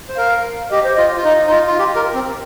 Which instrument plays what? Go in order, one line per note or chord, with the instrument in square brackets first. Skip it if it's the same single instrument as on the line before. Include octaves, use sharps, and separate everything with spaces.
[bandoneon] C5
[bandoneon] A#4 [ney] F5
[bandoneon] G4 [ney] D#5
[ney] C5
[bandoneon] F4 [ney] D#5
[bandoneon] F4
[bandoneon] D#4 [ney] D#5
[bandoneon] D#4
F4
F4
G4
A#4
C4